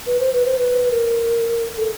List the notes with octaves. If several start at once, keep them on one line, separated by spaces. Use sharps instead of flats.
B4
C5
B4
C5
B4
A#4
A4